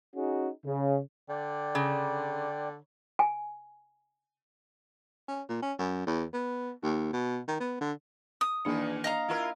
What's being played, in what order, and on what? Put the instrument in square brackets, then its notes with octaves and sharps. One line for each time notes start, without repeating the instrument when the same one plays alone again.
[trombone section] C#4 D#4 F#4 G#4
C#3
[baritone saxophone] D3 [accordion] D5 G5
[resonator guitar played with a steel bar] C#3
[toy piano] G#5
[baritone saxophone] C#4
A#2
C#4
F#2
E2
B3
D#2
B2
D#3
B3
D3
[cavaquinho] D#6
[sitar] E2 A#2 D#3 [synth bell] A#3 D4 C#7
[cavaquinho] D#5 F5 A#5
[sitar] E4 F4 A#4